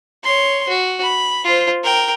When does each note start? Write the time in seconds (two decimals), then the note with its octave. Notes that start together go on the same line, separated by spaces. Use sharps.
0.23 C#5 C6
0.68 F#4
1.03 B5
1.44 F4 C5
1.83 A#4 G5